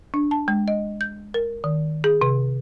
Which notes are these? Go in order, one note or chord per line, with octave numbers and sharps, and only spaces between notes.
D4
A5
G#3
D#5
G6
A#4
D#3
G#4
C3